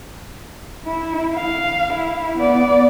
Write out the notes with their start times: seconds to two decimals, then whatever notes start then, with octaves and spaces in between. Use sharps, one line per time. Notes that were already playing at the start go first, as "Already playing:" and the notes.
0.85 E4
1.34 F5
1.94 E4
2.38 B3 D5